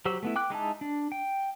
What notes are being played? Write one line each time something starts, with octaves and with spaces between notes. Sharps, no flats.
F#3 G4 C5 E6
A3 B3 E4
G5 D6 F#6
G#3 D#4 E4 A5
D4
G5